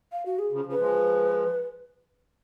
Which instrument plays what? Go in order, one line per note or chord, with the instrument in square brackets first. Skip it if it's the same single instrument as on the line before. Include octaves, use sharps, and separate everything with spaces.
[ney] F5
F#4
G#4
[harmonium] C#3 F3
C#3 F3
[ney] B4
[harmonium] F3 G#3